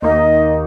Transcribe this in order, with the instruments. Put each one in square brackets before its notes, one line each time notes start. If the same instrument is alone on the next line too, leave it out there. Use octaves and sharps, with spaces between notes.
[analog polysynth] D#2 D#3 A#3 D#4 [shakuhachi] D#5